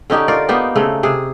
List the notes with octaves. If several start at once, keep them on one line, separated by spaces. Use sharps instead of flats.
D3 C#4 D#4 G4
F4 A#4 D5
A#3 B3 D#4 G4
C#3 A3 C4
C3 G#4